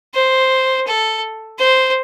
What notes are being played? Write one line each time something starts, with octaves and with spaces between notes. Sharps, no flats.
C5
A4
C5